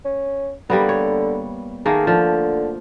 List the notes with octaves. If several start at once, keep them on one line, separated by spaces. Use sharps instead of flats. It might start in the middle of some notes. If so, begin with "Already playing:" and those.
C#4
D3 G3 A#3 B3
C#5
D#3 A3 A#3 G#4
D3 F3